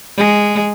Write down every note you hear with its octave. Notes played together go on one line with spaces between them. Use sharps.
G#3